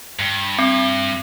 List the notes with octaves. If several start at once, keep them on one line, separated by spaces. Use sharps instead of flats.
G2
C4